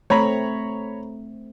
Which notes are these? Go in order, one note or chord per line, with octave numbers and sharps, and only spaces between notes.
A3 C4 C#5 A#5 B5